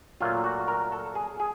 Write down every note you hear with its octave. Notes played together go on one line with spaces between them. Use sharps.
A#2 F#3 A3 F4
F#4
A#4
A4
G#4
G#4